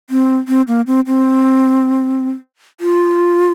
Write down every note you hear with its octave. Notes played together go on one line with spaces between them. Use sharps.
C4
C4
A#3
C4
C4
F4